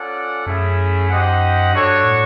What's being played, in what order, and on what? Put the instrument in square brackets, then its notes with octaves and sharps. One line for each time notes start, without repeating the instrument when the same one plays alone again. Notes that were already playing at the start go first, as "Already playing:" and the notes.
Already playing: [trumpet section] C#4 F4 A4 D5 F#5
[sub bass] F#2 [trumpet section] A3 C#4 E4 G#4
[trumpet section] D#4 G4 C5 D#5 F#5
[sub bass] G2 [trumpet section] D4 F#4 A4 C#5
[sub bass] A2